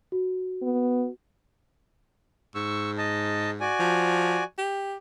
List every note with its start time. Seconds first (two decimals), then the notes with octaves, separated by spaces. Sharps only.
0.12 F#4
0.63 B3
2.55 G#2 C#6 E6
2.98 D#5 A5
3.61 F#4 D5 G#5
3.79 F3
4.58 G4